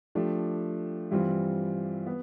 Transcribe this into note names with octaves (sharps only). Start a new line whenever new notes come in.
F3 A3 D4 G4
G2 E3 G3 C4 F4
B3